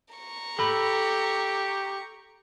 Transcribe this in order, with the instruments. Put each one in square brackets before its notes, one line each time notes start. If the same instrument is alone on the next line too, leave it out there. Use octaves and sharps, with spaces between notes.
[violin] A#5 C#6
[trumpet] G4 [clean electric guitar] A4 B5